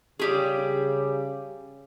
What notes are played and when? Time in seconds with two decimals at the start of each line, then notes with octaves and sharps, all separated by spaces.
0.19 C#3 G3 G4 G#4